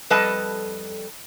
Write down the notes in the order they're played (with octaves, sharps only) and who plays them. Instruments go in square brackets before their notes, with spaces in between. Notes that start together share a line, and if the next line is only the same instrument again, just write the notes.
[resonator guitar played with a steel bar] F2 G3 A4 B4 D#5 A5